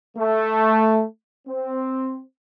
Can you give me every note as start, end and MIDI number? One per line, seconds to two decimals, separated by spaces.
0.18 1.03 57
1.48 2.21 60